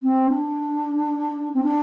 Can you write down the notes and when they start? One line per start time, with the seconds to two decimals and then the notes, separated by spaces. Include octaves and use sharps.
0.03 C4
0.29 D4
1.54 C4
1.63 D4